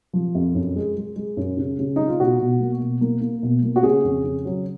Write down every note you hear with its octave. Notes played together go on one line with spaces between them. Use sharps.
F3
F2
F#2
G#3
G#3
G#3
F#2
C#3
C#3
G#3 D#4
F4
B2 F#4
B2
A#3
B2
A#3
A#3
B2
A#3
F#4
C#3 G#4
F2
C#3
F#3